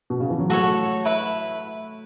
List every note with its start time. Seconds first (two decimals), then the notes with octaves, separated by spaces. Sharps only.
0.10 B2
0.20 C#3
0.30 E3
0.39 F#3
0.49 A3 F#4 A4 C#5
1.05 E4 B4 E5 B5